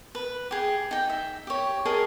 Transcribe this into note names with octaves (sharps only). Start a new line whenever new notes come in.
B4
G4 G#4
D#4 G5
E5
G4 C#5
G#4 A#4 D#5 A5